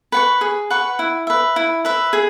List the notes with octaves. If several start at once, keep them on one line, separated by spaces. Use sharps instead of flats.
B4 F#5 C#6
G#4
B4 F#5 C#6
E4
B4 E5
E4
B4 E5
G#4